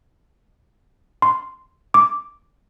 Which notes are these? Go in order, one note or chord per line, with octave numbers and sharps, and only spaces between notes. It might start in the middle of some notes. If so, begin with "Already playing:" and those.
C6
D6